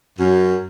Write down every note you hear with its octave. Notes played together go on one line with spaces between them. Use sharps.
F#2